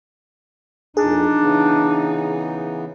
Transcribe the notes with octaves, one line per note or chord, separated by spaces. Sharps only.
F2 A#2 D4 D#4 G#4
C#3 E3 B3